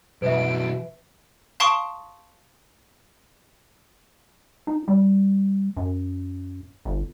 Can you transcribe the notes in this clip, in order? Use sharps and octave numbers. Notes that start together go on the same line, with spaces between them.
F#2 B2 E3 B4 E5 D7
F5 A5 C6 C#6 D#6 D7
D#4
G3
F#2
G1